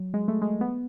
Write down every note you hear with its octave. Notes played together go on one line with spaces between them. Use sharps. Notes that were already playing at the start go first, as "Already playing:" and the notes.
Already playing: F#3
G#3
A3
G#3
B3